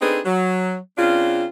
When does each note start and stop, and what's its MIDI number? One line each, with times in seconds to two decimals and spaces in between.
0.02 0.19 60
0.02 0.19 62
0.02 0.19 63
0.02 0.19 68
0.02 0.19 69
0.02 0.19 71
0.25 0.76 54
0.98 1.45 49
0.98 1.45 60
0.98 1.45 62
0.98 1.45 65